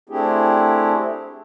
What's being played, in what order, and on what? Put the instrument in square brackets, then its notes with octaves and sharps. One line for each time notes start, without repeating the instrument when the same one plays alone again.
[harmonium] A3 C4 D4 E4 G4 G#4